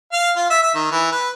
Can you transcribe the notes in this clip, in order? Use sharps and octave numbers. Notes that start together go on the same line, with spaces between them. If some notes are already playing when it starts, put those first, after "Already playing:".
F5
F4
E5
E5
D#3
E3
B4